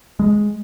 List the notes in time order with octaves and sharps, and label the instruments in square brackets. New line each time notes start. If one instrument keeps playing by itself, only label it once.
[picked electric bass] G#3